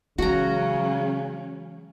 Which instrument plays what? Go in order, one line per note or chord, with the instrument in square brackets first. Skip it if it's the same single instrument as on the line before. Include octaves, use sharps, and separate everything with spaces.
[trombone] C#3 [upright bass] E3 G#3 [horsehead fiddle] F#3 C#4 [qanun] F#4 A#5